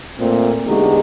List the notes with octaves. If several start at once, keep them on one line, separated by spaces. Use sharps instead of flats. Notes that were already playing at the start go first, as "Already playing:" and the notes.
A#2 A3 C4
E2 D3 G#3 D#4 F#4 G4